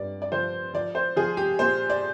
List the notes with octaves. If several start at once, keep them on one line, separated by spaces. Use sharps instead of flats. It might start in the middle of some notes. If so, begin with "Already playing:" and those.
Already playing: G2 D5
D5
F3 C5
F3 D5
C5
F3 G#4
G4
A#2 C5
D5